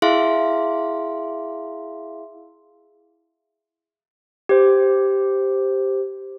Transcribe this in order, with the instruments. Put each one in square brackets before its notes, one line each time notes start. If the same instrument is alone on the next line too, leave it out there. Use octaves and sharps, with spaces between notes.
[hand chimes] E4 G#4 E5 F5 C6
[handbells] G4 C5